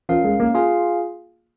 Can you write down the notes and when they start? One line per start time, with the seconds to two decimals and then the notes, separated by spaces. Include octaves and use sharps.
0.09 F3 C#4 A#4 F5
0.24 G#3
0.40 A#3
0.54 F4 G#4 F5 G#5